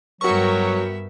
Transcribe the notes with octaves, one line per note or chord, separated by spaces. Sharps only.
G2 F#3 B3 F#4 A#4 E5 G5 C#6